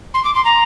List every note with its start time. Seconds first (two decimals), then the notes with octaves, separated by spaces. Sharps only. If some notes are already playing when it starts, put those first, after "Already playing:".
0.14 C6
0.24 D6
0.34 C6
0.44 A#5